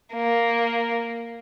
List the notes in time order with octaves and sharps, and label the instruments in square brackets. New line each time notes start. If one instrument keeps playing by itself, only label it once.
[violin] A#3